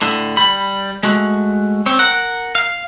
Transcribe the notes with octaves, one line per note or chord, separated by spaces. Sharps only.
A2 D3
G3 B5
G#3 A3 F#4
C4 C#5
A#4 F#5
F5